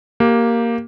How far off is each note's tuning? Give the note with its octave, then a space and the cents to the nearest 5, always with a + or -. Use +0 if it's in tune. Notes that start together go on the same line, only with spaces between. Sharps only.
A#3 +0 G4 +0